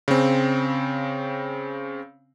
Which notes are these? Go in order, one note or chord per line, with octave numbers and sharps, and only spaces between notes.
C#3 C4